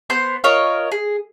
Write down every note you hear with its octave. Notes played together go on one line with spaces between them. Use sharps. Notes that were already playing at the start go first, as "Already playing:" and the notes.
B3 C5 C6 G6
F4 A#4 C#5 D#5
G#4